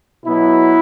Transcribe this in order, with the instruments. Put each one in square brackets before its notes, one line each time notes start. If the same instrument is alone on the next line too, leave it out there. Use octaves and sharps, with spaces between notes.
[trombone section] B2 F#3 B3 E4